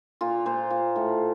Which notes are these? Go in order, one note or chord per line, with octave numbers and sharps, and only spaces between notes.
A#2 F4
A#2 C5
A#2
A2